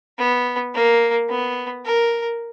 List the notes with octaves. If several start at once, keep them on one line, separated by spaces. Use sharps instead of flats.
B3
A#3
B3
A#4